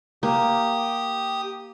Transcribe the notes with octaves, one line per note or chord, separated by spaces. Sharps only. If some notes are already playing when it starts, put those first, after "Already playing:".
A#3 G4 D#6